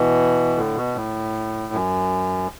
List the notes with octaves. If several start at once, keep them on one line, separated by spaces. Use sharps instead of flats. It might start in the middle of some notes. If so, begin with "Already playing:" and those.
Already playing: B2 E3
A2 D3
B2
A2
F#2